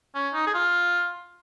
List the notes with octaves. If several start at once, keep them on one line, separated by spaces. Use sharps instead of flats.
C#4
D#4
G#4
F4